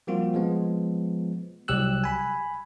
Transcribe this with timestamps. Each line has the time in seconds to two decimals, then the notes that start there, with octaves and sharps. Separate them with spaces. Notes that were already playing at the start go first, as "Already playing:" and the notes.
0.07 F3 G3 A#3 C4 F4 F#4
0.34 F3 G#3 B3
1.68 C2 F#3 G4 E6 F#6
2.04 G#5 B5